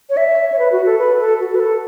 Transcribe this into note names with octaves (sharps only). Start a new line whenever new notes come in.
C#5
E5
C#5
B4
F#4
A4
B4
A4
F#4
B4
A4